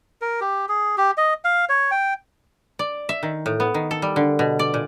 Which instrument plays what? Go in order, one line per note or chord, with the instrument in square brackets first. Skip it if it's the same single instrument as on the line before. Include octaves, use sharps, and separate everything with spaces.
[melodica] A#4
G4
G#4
G4
D#5
F5
C#5
G5
[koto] D5
E5
D#3
A2
B3
D#3
A4
G3
D3
B2
D5
A#2